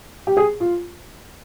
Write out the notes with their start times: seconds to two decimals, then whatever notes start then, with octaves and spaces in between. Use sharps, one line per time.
0.27 G4
0.37 G#4
0.60 F4